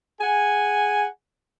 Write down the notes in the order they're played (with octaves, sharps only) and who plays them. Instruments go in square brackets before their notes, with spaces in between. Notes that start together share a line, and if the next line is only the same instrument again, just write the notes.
[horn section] G#4 F#5 G#5